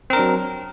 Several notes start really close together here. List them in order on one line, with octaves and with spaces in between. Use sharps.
C4 A#4 D4 F#3